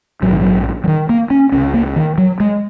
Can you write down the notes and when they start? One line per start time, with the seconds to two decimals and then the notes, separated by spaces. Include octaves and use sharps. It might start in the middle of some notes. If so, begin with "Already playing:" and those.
0.22 A#1 G#2 F#3
0.32 D#3
0.41 F#3
0.84 F#3
0.88 D#3
1.09 A#3
1.30 C#4
1.52 C#2 C#3 C#4
1.74 A#3
1.96 D#3
2.18 F#3
2.40 G#3